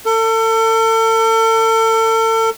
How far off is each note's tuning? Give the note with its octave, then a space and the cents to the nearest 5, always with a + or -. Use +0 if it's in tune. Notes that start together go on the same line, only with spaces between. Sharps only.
A4 +35